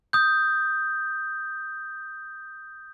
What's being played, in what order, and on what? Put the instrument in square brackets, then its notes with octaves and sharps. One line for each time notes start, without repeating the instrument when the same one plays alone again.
[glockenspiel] D#6 G6